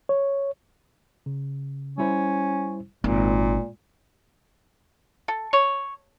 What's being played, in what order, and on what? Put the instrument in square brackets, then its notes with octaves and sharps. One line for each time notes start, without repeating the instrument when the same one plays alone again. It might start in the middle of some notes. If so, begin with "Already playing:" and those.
[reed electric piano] C#5
[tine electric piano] C#3
[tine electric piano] G3 E4 C5 [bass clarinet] C#4
[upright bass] G#1 [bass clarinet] A#2 [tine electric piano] A#3
[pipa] A4
C#5